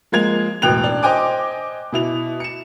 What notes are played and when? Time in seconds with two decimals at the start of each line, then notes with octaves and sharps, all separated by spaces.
0.12 F3 G#3 A#3 G#6 F7
0.62 E1 A1 B2 G5 F#6 F7
0.84 D4
1.03 C5 D#5 G5 G#5 D6
1.92 B2 E4 F7
2.40 C#7 E7